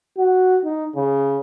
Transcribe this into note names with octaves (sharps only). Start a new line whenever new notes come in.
F#4
D#4
C#3